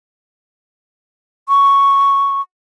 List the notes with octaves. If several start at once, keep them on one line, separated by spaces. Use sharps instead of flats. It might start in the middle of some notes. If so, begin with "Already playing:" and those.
C#6